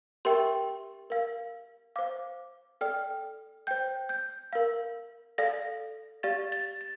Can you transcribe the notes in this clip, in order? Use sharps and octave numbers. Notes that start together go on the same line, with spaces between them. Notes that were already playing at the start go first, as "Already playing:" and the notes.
G4 A#4 E5 G5 C6
A#4 F5
C5 F5 D6
A4 D5 G5 F6
C5 G5 G6
G6
A#4 F5
A4 D5 F5 A#6
G4 D5 F5 A6
A6
A6